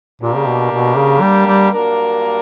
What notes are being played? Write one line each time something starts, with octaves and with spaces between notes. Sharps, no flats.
A#2 D3 A#3 D4 G4 A#4
C#3
B2
B2
C#3
G3
G3
G2 F#3 A#3 D4 A#4